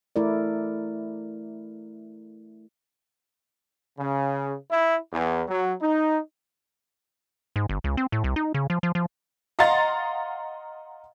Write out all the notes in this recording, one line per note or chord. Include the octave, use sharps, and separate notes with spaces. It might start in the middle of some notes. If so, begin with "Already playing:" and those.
A3 E4 A#4 D5
C#3
E4
E2
F#3
D#4
G#2
G1
C#2
C4
A2
C2
D#4
C#3
F3
F3
F3
D#5 F5 F#5 A#5 C6 A6